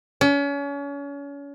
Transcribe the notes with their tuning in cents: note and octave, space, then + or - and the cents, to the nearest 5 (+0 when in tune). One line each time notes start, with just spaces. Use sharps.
C#4 +35